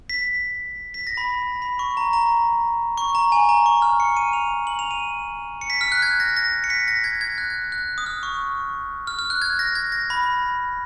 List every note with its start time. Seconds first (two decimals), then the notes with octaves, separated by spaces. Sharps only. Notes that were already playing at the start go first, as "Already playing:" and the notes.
0.10 B6
0.94 B6
1.07 A#6
1.17 B5
1.62 B5
1.79 C#6
1.97 A#5
2.13 A#5
2.97 C#6
3.15 A#5
3.32 G#5
3.49 A#5
3.66 C#6
3.82 F6
4.00 C#7
4.17 D#7
4.33 F7
4.67 F#7
4.79 F7
4.91 D#7
5.61 C#7
5.70 B6
5.81 F6
5.92 F#6
6.02 G#6
6.20 A#6
6.37 A#6
6.64 C#7
6.70 B6
6.88 A#6
7.04 G#6
7.21 G#6
7.38 F#6
7.50 G#6
7.72 F#6
7.98 D#6
8.06 F6
8.23 C#6
9.07 F6
9.19 F6
9.30 F#6
9.42 G#6
9.59 A#6
9.75 G#6
9.92 A#6
10.10 B5